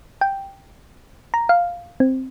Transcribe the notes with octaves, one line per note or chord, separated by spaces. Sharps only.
G5
A#5
F5
C4